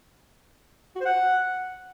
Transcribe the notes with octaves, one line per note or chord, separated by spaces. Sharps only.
F#4
C5
F#5